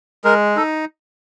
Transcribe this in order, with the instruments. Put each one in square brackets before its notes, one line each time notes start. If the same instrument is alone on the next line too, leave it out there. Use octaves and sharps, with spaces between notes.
[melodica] G#3 A#4
D#4 A4